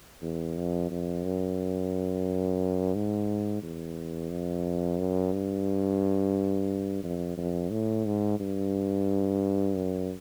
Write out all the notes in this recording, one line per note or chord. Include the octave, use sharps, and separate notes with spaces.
E2
F2
F2
F#2
G#2
E2
F2
F#2
G2
F2
F2
A2
G#2
G2
F#2